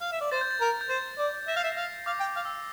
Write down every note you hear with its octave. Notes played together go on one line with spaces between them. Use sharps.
F5
E5
D5
C5 A6
G6
A6
A#4
G6
C5 A6
D5
E5 A#6
F5
E5 C7
F5 A#6
F5 D6
G5
D6
F5
E6